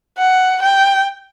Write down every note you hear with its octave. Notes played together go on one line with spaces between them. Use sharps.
F#5
G5